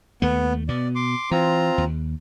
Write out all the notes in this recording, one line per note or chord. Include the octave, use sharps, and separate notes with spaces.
D#2 A3 B3
B2 B3 D5
C6 D6
E3 C4 F4 A#5
D#2